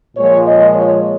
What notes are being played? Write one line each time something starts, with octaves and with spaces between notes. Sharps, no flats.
A#2 F3 G#3 C#5
D#5
C#5